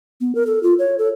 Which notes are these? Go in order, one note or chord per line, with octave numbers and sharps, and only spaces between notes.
B3
A#4
A4
F4
C#5
A4